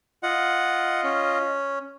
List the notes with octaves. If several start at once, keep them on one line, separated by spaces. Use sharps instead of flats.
F4 D#5 F#5
C#4